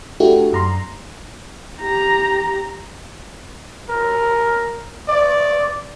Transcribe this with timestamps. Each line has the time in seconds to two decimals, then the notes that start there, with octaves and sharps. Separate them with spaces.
0.20 A3 D4 E4 F#4 G4 A4
0.53 F#2 A#5 C6
1.79 G4 A#5
3.90 A#4
5.08 D5